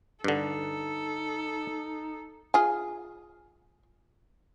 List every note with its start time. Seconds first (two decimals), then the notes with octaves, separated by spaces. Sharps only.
0.24 G2 D3 D#4 A4
2.54 F4 G#4